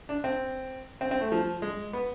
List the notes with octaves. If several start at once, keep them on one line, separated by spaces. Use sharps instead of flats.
D4
C4
C4
C4
A3
F3
G#3
B3